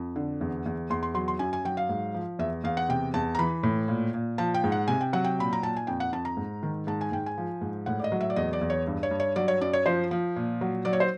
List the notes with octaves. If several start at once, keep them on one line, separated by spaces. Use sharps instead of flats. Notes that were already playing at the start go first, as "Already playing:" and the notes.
Already playing: F2
D3
E2
E2
E2 C6
C6
F#3 C6
C6
F#2 G#5
G#5
F#3 G5
F5
G#2
F3
E2 E5
E2 F5
F#5
C3 G5
E2 A5
A#5
E3 B5
A2
A#2
A#2
F3 A5
G5
G#2
F#5
C3 G#5
G5
F#3 F#5
G5
A#2 B5
A#5
A#2 A5
G#5
F2 G5
F#5
F2 A5
A#5
G#2
D#3
G#2 A5
G#5
G#2 G5
G#5
F3
G#2
A2 F#5
D5
D#5
F#3
E5
D5
E2 D#5
D5
E2
C#5
G2
C#5
G2
C#5
F#3 D5
C#5
F#2 D5
C#5
F3 C5
F3
A#2
F#3
F#3 D5
C#5
C5